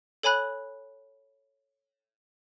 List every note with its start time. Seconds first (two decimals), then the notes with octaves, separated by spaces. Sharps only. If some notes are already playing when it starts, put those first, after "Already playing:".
0.23 A4 C#5 G#5 B5 F#6